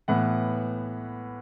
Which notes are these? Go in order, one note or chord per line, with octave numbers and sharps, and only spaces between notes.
A2 E3 B3 F#5